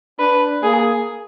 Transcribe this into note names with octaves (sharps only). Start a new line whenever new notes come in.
D4 B4
A#3 G#4